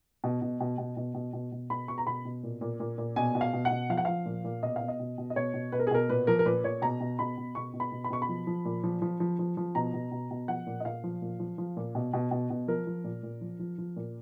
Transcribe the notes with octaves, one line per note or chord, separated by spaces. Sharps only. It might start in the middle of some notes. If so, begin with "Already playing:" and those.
B2
B2
B2
B2
B2
B2
B2
B2
B2 B5
B2 C#6
A#5
B2 B5
B2
A#2
A#2
A#2
A#2
B2 G#5
B2
F5
B2
F#5
B2
F3 F5
F#5
F3 F5
A#2
A#2
B2 D#5
B2 F5
D#5
B2
B2
D#5
B2 C#5
B2
B2 B4
A#4
G#4
B2 A#4
A#2 B4
F3 A#4
A#4
A#2 B4
A#2 C#5
B2 A#5
B2
B2 B5
B2
B2 C#6
B2
B5
B2
B5
B2 C#6
B5
F3
F3
A#2
F3
F3
F3
F3
F3
B2 A#5
B2
B2
B2
F3 F#5
A#2
D#5
A#2 F5
F3
A#2
F3
F3
A#2
B2
B2
B2
B2
F3 A#4
F3
A#2
A#2
F3
F3
F3
A#2